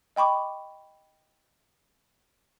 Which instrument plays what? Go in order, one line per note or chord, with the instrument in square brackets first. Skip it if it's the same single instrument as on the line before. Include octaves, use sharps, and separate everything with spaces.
[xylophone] D#5 G5 B5 C#6 D6